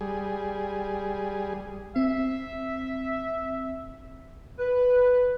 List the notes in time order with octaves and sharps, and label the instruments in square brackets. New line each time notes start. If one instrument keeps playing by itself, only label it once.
[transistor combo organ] G3 G#4
[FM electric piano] C4 [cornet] E5
[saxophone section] B4